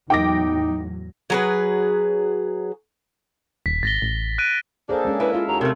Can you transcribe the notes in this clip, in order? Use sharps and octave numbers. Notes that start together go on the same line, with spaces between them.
E2 A2 F#3 D#4 G5 D6 A#6
F#3 G#4 B4
D#1 B6
G#1 A6 A#6 G7
A1
F#6 D7 D#7
A#3 D4 G#4 A4 C5
G#3 C#4 G#4
E4 B4
F4 F5
D#2 F#3 A#5
C3 A3 A#4